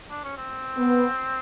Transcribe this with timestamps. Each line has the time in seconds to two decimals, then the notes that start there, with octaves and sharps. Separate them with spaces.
0.10 D4
0.24 C#4
0.37 C4
0.77 B3